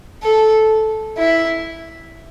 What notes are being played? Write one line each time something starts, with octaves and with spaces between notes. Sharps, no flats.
A4
E4